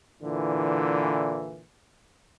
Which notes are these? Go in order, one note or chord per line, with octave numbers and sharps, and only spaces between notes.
A#2 D3 E3